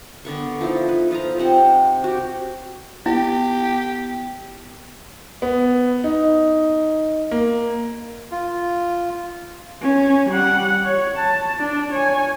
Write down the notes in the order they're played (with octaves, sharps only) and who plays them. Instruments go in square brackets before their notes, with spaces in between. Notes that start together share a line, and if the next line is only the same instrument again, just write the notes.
[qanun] D3 B3 C#6
F3 D#4 E4 A4
B4
F3 F4 D#5 A#5
C3 C4 F#5
F#4 G4
[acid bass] B3 [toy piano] E4 [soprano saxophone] G4
[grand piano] B3
D#4
A#3
[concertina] F4
[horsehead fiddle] C#4
G3 F#5
C#5
A5
D4
C#5 G#5